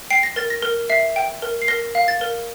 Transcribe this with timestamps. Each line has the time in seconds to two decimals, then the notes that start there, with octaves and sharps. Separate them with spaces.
0.10 G5 C7
0.23 A#6
0.36 A#4 A6
0.50 A#6
0.63 A#4
0.90 E5 C7
1.16 G5
1.42 A#4
1.62 C7
1.68 A#4 A#6
1.95 F5
2.08 A6
2.21 A#4